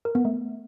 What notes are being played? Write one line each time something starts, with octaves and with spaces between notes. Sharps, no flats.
A#4
B3
A3